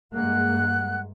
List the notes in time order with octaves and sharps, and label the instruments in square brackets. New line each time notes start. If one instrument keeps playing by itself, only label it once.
[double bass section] G2 G#3 A#3 [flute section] F#5 F#6